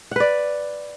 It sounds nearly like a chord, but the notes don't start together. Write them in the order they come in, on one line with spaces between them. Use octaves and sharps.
F#5 B4 D5